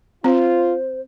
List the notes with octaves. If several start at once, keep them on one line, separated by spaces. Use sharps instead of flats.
C4 F4 C5